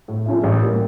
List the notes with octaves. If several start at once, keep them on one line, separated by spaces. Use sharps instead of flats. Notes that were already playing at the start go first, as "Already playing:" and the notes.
A2
F3 C#4 E4
A1
A2 G3 A#3